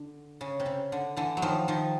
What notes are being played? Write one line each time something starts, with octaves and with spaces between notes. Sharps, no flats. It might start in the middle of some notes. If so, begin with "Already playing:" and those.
Already playing: D3
C#3
C3
C#3
D3
D3 E3
F#3
D#3 F3
D#3 F3